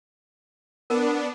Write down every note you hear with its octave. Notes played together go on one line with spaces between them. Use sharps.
B3 D4 A#4